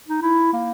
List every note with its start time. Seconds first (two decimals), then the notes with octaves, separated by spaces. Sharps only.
0.08 D#4
0.22 E4
0.53 A#3